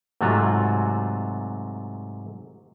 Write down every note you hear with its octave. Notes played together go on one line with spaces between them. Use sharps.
G#2 C3 F#3 A3 F4 F#4